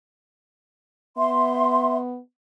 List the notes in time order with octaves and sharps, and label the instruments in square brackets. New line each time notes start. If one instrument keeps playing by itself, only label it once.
[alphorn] B3 [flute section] E5 C6